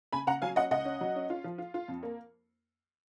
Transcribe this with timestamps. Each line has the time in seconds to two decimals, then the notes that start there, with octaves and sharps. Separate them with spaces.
0.13 C#3 G#5 B5
0.27 C#3 F#5 A#5
0.42 F#3 F5 G#5
0.56 C#4 D#5 F#5
0.71 C#2 D#5 F#5
0.85 C#4
1.01 F#3
1.16 C#4
1.30 F4
1.44 F3
1.58 F4
1.74 F4
1.88 F2
2.03 A#3